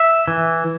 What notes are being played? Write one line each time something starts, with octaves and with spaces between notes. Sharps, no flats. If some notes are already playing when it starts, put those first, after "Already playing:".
Already playing: E5
E3